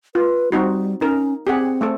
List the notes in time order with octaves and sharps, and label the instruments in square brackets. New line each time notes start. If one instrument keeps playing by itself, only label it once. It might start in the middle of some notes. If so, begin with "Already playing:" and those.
[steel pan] F4 [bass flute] B4
[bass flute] G3 [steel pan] C4 D#4 F#4
[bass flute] C#4 [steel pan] D#4 A#4
[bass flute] C4 [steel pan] G4 G#4 F#5
[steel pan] A3 C4 A4